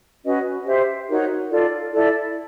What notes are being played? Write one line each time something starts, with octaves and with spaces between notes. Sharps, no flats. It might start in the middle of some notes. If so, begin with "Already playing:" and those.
C#4 F#4 B4 D#5
G4 C5 E5
D#4 F#4 A#4 C#5
F4 A4 D5
E4 A4 D5